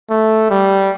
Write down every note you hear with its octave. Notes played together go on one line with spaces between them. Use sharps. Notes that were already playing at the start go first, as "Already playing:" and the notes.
A3
G3